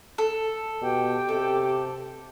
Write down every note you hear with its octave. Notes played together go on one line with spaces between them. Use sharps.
A4
B2 G4 G5
C3 A4